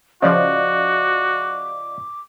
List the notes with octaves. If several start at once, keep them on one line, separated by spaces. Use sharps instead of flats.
C#3 F3 F#4 D5 D#5 F5 D6